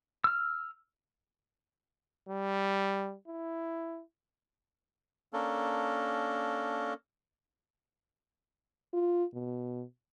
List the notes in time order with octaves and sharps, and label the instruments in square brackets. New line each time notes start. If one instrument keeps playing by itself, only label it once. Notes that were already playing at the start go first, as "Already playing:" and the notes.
[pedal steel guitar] E6 F6
[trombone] G3
E4
[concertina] A#3 C#4 D4 A4 A#4
[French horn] F4
B2